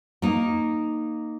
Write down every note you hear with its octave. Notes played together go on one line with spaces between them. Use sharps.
A#3 D#4